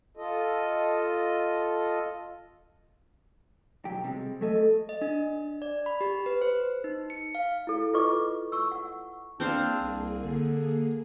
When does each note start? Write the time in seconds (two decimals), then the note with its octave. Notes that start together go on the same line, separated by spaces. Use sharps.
0.17 F4 A4 D#5
3.85 B1 F#3 G4
4.04 C3 G3 G#3
4.41 F#3 A3 A4 D#5
4.89 D#5
5.01 D4
5.62 D5
5.86 B5
6.01 G4
6.26 B4
6.41 C5
6.84 D#4
7.10 C#7
7.35 F5
7.67 E4 A4
7.94 F4 A4 B4 D#5 C#6 D6
8.52 C#6 E6
8.72 F#5
9.40 A#3 C4 D4 G#4 C5 F5
9.82 C2
10.23 D3